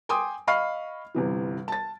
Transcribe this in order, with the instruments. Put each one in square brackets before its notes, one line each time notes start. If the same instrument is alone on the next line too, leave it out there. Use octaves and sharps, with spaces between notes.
[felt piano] G5 G#5 C6 D6 D#6
D#5 F5 B5 C#6 F6 C7
G1 C3 E3
A5 A6